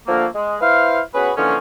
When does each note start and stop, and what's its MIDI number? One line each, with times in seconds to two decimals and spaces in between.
0.07 0.26 50
0.07 0.26 53
0.07 0.26 57
0.07 0.26 58
0.35 0.56 56
0.61 1.00 64
0.61 1.00 71
0.61 1.00 72
0.61 1.00 77
1.14 1.30 59
1.14 1.30 61
1.14 1.30 66
1.14 1.30 68
1.14 1.30 71
1.37 1.56 50
1.37 1.56 52
1.37 1.56 53
1.37 1.56 58
1.37 1.56 61